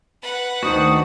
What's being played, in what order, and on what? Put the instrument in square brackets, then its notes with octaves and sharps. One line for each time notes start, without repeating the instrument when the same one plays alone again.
[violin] B4 F#5
[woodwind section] D2 C5 D#6 [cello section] D#3 [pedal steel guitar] D4 F#4